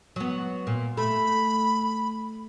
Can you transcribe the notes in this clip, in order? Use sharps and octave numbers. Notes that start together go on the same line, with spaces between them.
F#3 B3
A#2
A3 B5